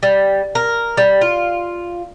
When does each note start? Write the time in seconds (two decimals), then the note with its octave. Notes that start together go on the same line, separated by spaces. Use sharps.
0.03 G3
0.55 A#4
0.97 G3
1.21 F4